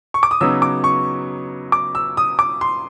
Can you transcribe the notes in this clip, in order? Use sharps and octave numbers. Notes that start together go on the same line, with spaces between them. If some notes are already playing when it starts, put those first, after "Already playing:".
C#6
D6
D#6
C#3 F#3 B3 D#4 E6
D6
C#6
D6
E6
D#6
D6
C6